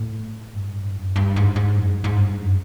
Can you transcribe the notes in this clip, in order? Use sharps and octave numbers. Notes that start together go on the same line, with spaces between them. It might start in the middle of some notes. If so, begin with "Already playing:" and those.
Already playing: A2
G2
F#2
G2
G#2
G#2
F#2
G2
G#2
G2
F#2